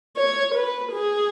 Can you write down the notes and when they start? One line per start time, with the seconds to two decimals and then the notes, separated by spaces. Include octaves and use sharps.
0.17 C#5
0.55 B4
0.93 G#4